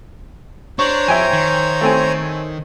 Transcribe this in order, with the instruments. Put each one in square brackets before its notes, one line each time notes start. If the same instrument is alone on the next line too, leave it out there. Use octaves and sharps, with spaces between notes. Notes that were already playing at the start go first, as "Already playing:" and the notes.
[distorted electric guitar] D4 [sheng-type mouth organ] C5 C#5 A#5 [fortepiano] C#6
[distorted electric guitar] F2 [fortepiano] E5 G5 G#5
[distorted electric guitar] D#3
[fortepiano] A3 C4 G#5